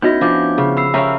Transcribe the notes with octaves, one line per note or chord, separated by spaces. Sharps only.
B3 C#4 D#4 E4 F#4 D#5 G6 A#6
F3 D4 D6 G6
C#3
B5 E6 C7
C#4 G4 A#4 E5 F5 A#5 B5 E6